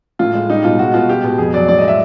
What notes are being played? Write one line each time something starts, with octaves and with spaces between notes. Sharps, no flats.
A2 F4
G#3
G3 D#4
B2 F4
G#3 F#4
B2 F4
G#3 G4
B2
F2 G#4
F#3 D5
A2 D5
D#5
G#3 E5